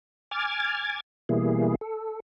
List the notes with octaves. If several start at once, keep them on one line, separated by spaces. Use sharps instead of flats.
G#5 D6 F6 G#6 A6
B2 E3 G3 A#3 E4 G#4
A4